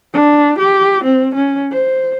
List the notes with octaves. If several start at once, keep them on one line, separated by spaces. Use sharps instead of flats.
D4
G4
C4
C#4
C5